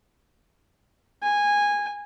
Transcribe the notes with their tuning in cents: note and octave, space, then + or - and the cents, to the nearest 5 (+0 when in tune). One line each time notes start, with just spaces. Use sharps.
G#5 -15